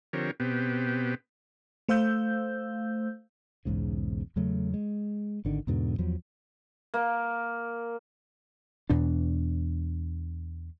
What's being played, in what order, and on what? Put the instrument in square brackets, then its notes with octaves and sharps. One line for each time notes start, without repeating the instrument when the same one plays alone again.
[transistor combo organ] D3 F3 C4 G4 A#4 C#5
B2 B3 C4 G4
[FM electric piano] A3 C5 F5 E6 G6
[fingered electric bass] B1 E2 G#2 C#3
E2 C#3 F#3 A3
G#3
G#1 D3 D#3
E2 G#2 B2 D3
E2 F3 F#3
[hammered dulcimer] A#3
[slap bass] E2 B2 D4